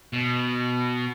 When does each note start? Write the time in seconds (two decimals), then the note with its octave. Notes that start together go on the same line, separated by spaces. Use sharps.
0.13 B2